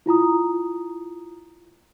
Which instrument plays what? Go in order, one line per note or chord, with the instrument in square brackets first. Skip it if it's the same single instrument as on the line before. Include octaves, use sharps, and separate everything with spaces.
[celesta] E4 F4 A#5 D#6